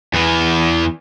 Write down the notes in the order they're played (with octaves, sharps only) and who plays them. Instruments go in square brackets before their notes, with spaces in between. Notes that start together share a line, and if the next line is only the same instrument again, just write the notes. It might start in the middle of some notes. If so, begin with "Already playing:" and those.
[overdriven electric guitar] E2 E3